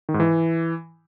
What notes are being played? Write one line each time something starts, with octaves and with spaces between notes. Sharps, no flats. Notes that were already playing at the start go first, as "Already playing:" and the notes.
D#3
G#2
E3